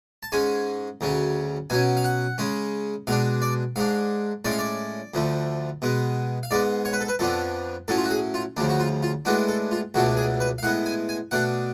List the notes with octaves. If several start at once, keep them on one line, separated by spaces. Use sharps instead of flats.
A5
G#2 G#3 C#4 G#5
D2 C#3 F#3 C#4
B2 F#3 C#4 G#5
F5
F#5
C#3 G#3 C#4
B2 G#3 D4 F5
D5
G#2 G#3 D4 F5
A2 G#3 C#4 D5
F5
D5
D2 D3 F3 A3
B2 G#3 B3
F5
G#2 G#3 B3 D5
C#5
B4
A4
B4
F2 F3 B3 D4 A4
A2 F#3 C#4 A4
F4
F#4
G#4
F4
D2 C#3 F3 D4
F#4
F4
F4
A2 G#3 B3 D4 F#4
A4
F4
C#2 B2 F#3 A3 D4 F#4
G#4
B4
F5
A2 G#3 B3 F#5
G#5
G#5
B2 A3 D4 F#5